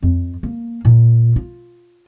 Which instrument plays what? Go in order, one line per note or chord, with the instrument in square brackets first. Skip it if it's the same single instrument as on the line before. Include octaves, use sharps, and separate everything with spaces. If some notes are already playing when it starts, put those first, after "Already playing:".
[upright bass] F2
A#3
A#2
F4